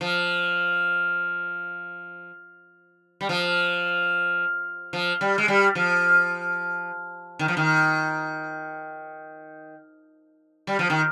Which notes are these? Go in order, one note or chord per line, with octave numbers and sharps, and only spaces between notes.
F3
G3
F3
F3
G3
G#3
G3
F3
D#3
F3
D#3
G3
F3
D#3